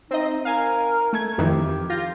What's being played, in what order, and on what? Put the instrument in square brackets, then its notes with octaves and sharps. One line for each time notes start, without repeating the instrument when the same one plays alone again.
[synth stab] C4 D#5 [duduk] D#4
[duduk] A#4 [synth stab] F5 G#5
[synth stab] A3 G#6
[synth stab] F2 D#3 E3 [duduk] G4
[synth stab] F4 G6 A#6